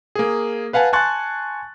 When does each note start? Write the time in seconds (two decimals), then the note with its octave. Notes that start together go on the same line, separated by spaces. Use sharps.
0.15 A#3 G#4
0.73 B4 F5 F#5 G#5 A5
0.93 G#5 A5 C6 C#6 F#6 A6